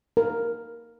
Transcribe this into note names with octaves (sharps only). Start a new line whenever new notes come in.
A#4